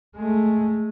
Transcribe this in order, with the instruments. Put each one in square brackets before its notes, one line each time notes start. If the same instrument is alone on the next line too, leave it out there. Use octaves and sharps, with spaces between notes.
[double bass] G#3 A3